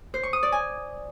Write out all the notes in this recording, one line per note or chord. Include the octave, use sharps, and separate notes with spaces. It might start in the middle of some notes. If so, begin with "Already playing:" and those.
C5
C#6
D#6
D5
G#5